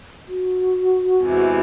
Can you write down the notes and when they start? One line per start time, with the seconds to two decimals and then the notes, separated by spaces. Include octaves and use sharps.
0.28 F#4
1.22 E2 C3 E3 G#3